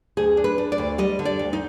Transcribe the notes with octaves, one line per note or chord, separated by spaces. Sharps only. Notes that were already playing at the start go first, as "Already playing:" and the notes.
D2 G#4
D4
B4
D4
D5
D2
G3 D#5
D3
D5
D2
D#4